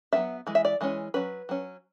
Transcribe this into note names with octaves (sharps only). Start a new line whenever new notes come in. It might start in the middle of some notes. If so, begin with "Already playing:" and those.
F#3 B3 D4 E5
E3 G#3
E5
D5
E3 G#3 C#4
F#3 C#4 B4
F#3 C#4